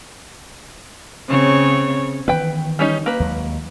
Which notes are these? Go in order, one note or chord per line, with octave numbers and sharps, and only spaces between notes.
C#3 C4 C#5
D#3 E3 B3 B4 G5
G3 C#4 D#4
A#3 B4
D#2 F#3 G#3